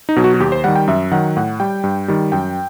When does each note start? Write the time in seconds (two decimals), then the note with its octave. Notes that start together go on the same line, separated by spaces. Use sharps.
0.09 D#4
0.16 B2 F#3
0.24 F#4
0.34 F#4
0.40 D#2 G4
0.52 C5
0.64 D#3 G3 F#5
0.76 G5
0.88 F#2 E5
1.12 D#3 F#3 F#5
1.37 A2 F#5
1.60 G3 G5
1.84 G2
2.08 D#3 G3
2.32 F#2 G5